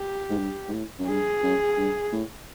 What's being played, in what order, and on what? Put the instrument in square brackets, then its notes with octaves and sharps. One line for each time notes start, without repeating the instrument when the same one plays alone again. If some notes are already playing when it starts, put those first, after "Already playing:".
Already playing: [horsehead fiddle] G4
[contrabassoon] G#2
G2
G#2
A2
F#2
[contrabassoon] G2 [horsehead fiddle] G#4
[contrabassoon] F#2
G2
A2